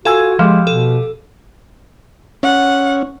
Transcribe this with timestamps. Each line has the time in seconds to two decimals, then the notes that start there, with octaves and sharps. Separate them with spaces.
0.05 F4 F#4 A4 G#5 E6 G#6
0.39 F3 G#3 G4 F5
0.67 B2 A4
2.43 C#4 F#5